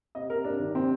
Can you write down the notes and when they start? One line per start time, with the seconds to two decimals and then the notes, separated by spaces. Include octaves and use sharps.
0.15 C3 D#5
0.30 C3 A#4
0.44 C3 D4
0.60 D#3
0.75 C3 C4